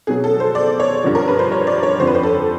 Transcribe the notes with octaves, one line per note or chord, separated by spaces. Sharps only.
B2 F#3 G#4
A4
C5
D5
C#5
G2 D3 F3
A#4
B4
C5
C#5
D5
C#5
F2 D3 F3 C5
B4
C5
A4